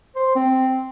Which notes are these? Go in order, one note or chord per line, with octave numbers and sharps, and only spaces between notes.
C5
C4